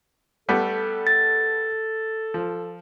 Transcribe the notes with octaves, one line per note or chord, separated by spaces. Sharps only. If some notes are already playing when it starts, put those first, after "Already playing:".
G3 A3 B3 A4
A6
F3